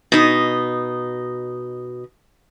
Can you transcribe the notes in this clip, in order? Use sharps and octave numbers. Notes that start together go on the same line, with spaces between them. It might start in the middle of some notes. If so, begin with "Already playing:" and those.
B2 D#4